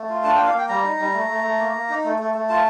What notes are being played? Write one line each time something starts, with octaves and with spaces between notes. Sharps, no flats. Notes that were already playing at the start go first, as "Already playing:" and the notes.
Already playing: A3
F4
D4 A5
G5
A#3
F5
A#3 G5
G3 A#5
D#4
G3
A3
A3
A3
A#3
A#3
D#4
A3
A3
A3
F4 A5